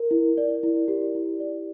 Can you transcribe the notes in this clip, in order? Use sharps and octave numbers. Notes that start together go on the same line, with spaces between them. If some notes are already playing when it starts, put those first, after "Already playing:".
Already playing: A#4
E4
D5
E4
G4
E4
D5